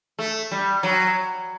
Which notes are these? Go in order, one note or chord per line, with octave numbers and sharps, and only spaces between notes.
A3
G3
F#3